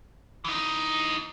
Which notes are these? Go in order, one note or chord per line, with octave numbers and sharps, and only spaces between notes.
E3 D#4